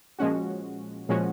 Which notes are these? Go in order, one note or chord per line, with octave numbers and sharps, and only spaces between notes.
A#2 F3 G#3 C#4 F#4
A#2 F3 G#3 C#4 F#4